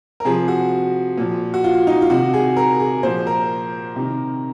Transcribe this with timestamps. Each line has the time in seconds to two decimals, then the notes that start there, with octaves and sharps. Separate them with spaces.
0.20 A#4
0.25 C3 F3 G#4
0.48 F#4
1.18 A#2 F3
1.54 F#4
1.64 F4
1.87 D#4
2.02 F4
2.10 C3 D#3 F#4
2.34 G#4
2.57 A#4
2.80 G#4
3.03 A#2 F3 C5
3.27 A#4
3.96 C3 D#3